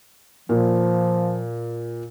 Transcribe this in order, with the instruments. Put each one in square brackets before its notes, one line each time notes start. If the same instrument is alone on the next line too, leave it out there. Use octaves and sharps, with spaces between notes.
[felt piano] A#2 [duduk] F3